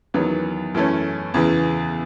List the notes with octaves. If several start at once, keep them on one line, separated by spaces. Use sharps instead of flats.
E2 D#3 F#3 B3
F#2 E3 A3 C#4
E2 C#3 E3